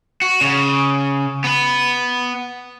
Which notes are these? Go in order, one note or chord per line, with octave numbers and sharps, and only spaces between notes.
F#4
C#3
B3 B4